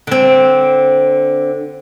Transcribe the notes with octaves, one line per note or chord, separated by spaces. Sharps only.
D3 C4